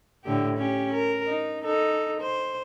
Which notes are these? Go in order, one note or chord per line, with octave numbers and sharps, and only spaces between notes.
A2 D3 G4
C#4 G4
A#4
D#4
D#4 A4
C5